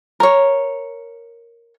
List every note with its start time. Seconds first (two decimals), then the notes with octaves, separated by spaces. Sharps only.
0.20 A#4 C#5